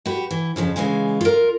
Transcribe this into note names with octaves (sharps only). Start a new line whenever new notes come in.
F#4 G4 B4
E3
F2 C#3 E3 F3
C#3 E3 G#3 F4 G#5
F4 A#4